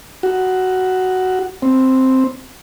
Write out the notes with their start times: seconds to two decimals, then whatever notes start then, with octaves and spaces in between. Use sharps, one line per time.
0.23 F#4
1.62 C4